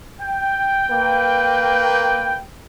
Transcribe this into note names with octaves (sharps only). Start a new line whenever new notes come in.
G5
A#3 B4